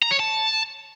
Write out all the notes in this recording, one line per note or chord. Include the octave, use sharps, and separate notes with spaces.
A#5
C#5
A5